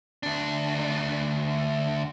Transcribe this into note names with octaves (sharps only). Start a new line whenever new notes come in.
D2 D4